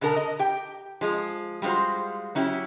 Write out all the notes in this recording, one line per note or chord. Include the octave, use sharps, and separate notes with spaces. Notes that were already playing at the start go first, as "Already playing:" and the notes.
B2 D3 B3 A#4 A5
D#5
G4 G5
F3 G#3
G3 G#3 F4 F#4 C5
F#3 C#4 E4 G4